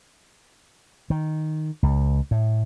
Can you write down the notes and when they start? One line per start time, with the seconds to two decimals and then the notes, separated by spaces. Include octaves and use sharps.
1.10 D#3
1.83 C#2
2.31 A2